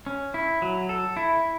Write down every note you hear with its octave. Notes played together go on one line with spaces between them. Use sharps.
C#4
E4
F#3
A4
E4